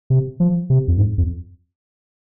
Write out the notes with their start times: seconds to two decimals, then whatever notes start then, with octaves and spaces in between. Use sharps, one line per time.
0.10 C3
0.40 F3
0.70 C3
0.88 F2
0.98 G#2
1.18 F2